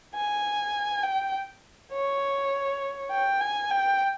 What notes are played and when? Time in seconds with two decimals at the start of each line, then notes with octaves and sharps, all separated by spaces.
0.15 G#5
1.04 G5
1.93 C#5
3.11 G5
3.41 G#5
3.70 G5